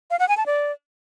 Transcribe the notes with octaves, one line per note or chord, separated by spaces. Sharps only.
F5
F#5
G#5
A5
D5